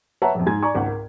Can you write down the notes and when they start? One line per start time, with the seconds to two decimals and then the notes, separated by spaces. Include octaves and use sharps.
0.22 B4 C#5 E5 F#5 A5 A#5
0.35 A#1 F2
0.46 G#2 G#5 G#6
0.63 D5 G#5 A#5 C#6
0.75 G#1 C#2 F#5
0.87 A#4